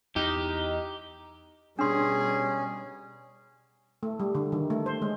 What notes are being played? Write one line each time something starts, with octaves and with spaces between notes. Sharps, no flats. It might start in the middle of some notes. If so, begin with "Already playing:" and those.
E2 D#4 G4
B2 G3 C#4 D4 G#4 C6
A3
G3
D3
D#3
A3
C5
G#3